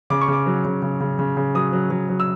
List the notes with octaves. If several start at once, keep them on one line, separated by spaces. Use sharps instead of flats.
C#3 D6
C#6
C#3 D6
F#3
C#3
C#3
C#3
C#3
C#3
F#3 D#6
F#3
F#3
F#3
E6